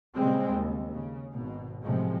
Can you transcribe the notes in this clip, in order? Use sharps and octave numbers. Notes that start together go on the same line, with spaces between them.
A#2 C#3 G3 G#3 C4
D#2
C#3
G#1 B2
F#2 A2 C3 F3 G#3